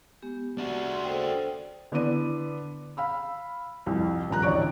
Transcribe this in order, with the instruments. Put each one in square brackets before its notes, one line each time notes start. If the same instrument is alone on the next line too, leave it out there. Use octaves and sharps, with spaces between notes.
[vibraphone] G#3 B3 G4
[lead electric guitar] D4 F#4
[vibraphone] G#4 C6
A4 C5 G5
[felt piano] D3 B3 E4 D5 D6 D#7
F5 B5 E6
C2 F2
D#1 F3 A#5 F#6
A1 D2 C#5 D5 C#6 D7